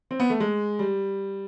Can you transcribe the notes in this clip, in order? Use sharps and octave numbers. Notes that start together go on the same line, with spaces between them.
C4
B3
A3
G#3
G3